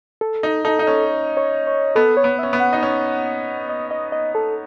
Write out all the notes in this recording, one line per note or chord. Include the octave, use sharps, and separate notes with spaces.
A4
D#4
D#4 A4
D#4
C#4
C#5
C#5
B3 A4
C#5
B3
C#4 E5
B3
F#5
D#4
C#4
D#5
D#5
D#5
A4